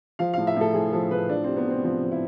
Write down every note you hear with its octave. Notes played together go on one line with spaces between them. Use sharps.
F3 F5
A2 F5
E5
A2 A4
F3 G#4
F3 A4
A2 B4
F3 D4
C3 C4
B3
C3 C4
F3 C4
F3
E4